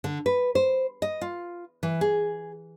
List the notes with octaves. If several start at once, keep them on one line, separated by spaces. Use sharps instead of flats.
D3
B4
C5
D#5
F4
E3
G#4